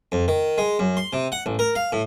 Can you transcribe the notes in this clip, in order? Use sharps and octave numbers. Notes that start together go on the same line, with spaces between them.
F2
D#3
G#3
F#2
C6
C3
F#5
A1
A#4
F5
A2